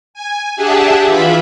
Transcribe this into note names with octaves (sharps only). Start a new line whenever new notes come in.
G#5
D4 G4 G#4 E5 F#5 A5
E3 F4 E5 B5